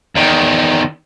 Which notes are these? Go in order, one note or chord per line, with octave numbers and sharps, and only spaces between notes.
E2 D#3